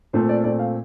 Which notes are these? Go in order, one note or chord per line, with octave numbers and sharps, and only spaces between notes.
A#2 A3 C4 C5
D5
A#2 A3 C4 D5
F5